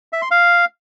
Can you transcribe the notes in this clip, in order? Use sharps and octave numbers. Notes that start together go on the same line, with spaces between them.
E5
C6
F5